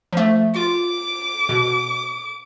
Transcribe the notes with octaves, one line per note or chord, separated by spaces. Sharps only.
F3 A3
F4 D6
B2